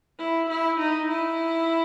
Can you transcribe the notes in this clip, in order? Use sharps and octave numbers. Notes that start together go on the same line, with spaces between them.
E4
E4
D#4
E4